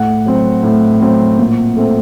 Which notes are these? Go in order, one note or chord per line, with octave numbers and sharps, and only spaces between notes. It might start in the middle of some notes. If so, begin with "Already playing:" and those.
Already playing: A2 F#5
F#3 C4
A2
F#3 C4
A#2
A3 C4